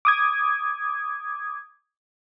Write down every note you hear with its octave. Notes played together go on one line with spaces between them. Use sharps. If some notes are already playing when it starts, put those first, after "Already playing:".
D6 D#6 G#6